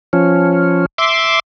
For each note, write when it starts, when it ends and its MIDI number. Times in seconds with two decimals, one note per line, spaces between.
0.13 0.86 53
0.13 0.86 61
0.98 1.40 76
0.98 1.40 84
0.98 1.40 86